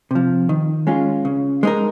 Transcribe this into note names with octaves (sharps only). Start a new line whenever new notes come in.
C3 F3
D#3
G#3 C#4 F4
C#3
G#3 D#4 A#4